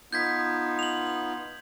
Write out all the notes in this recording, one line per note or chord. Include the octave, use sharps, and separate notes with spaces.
B3 D#4 F4 G6 G#6 B6
F7 F#7